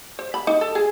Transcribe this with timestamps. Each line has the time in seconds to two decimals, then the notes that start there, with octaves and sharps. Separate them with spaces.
0.19 C5
0.34 B5
0.47 D#4
0.61 A4
0.75 G#4